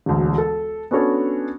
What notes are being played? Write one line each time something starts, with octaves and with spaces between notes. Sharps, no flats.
E1 D2
A4
B3 C#4 D4 F#4 A4 C#5